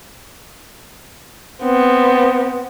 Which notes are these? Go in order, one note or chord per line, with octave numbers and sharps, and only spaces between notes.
B3 C4